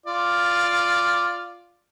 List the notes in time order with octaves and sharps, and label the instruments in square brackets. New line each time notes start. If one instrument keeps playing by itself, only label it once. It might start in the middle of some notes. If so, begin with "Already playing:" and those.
[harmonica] F4 D5